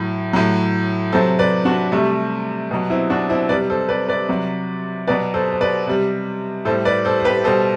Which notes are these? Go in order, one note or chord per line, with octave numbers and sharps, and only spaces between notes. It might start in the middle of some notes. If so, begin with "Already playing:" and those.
Already playing: A2 F#3
A2 F#3
C3 F#3 A4 C5
B4 D5
D4 F#4
C3 G3 A3
B2 F#3
C4 E4
D4 F#4
C4 E4
C3 G3 B4 D5
A4 C5
B4 D5
B4 D5
C3 F#3
B2 F#3 B4 D5
A4 C5
C5
B4 D5
C3 G3
A2 G3 A4 C5
B4 D5
A4 C5
C5
G4 B4
B2 G3 A4 C5